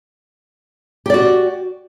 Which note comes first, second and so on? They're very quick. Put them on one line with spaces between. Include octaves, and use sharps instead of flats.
G4 D5 F#4